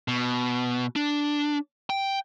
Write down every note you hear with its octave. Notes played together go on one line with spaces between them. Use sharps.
B2
D4
G5